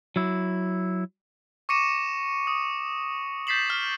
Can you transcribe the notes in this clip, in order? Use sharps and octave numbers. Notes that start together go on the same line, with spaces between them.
F#3 E4
C#6 D6 A#6 C#7 D#7 E7
D#6
G6 A6 B6 C7 E7 F#7
F6